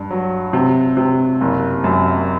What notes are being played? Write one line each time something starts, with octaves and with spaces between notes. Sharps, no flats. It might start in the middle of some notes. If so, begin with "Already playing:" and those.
Already playing: G2
F#3
C3
C3
F#1
F#2